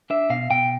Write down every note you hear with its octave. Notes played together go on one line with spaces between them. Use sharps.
D4 E5
B2 F5
B2 G5